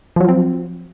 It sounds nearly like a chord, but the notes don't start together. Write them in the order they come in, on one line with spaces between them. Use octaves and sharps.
F3 F#3 F4 C4